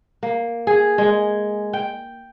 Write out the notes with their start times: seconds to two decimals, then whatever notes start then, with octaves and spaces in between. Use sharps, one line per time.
0.23 A#3
0.67 G#4
0.98 G#3
1.73 G5